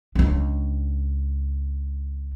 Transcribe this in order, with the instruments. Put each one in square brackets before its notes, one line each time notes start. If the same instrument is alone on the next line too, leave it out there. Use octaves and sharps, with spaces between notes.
[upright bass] C#2 D4